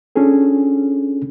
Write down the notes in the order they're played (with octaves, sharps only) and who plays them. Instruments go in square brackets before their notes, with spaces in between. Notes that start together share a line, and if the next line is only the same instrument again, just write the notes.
[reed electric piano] C#4 D4 F4 G#4 A4